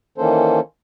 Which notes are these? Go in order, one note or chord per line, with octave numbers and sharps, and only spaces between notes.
D#3 E3 A#3 C#4 A4 C5